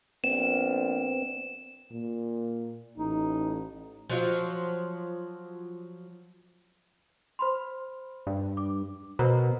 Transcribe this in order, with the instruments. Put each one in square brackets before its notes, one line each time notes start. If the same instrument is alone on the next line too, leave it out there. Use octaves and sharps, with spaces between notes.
[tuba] A#1 [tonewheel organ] B3 C4 [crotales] E7
[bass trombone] A#2
[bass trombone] A1 [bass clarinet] D#4
[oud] F3 F#3 F4
[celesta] C5 B5 C6
[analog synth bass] G2
[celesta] D6
[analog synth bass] B2 [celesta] A#4 C5 A#5